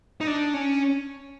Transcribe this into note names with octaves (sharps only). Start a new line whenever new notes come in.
D#4
D4
C#4